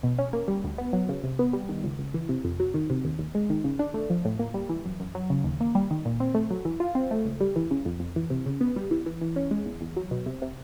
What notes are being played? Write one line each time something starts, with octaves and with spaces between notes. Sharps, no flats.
B2
C#4
A#3
G3
D2
B3
F#3
C#3
C3
B3
G3
D#3
C#2
C#2
E3
C3
F2
F#3
D#3
C3
D#2
D#2
G#3
D#3
C#3
D4
A3
F3
A2
A#3
G3
E3
F#2
F#2
F#3
C#3
D#2
A#3
G3
D#3
A#2
C4
A3
F#3
E3
F4
C4
A3
C#2
G3
E3
C#3
F2
F2
E3
C3
C#3
B3
G3
E3
E3
E3
C#4
G#3
E2
E2
F#3
B2
C3
C3